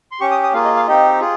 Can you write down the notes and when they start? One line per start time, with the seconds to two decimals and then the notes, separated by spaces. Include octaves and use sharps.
0.12 C6
0.20 C#4 G4 C#6
0.31 D#6
0.43 D#6
0.53 A#3 F4 G#4 F5
0.65 D#5
0.76 F5
0.87 C4 D#4 G4 D#5
1.20 F4 G#4